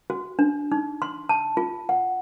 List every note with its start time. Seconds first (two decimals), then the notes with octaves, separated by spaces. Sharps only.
0.10 F#4
0.39 D4
0.72 D#4
1.02 C6
1.29 A5
1.57 F4
1.89 F#5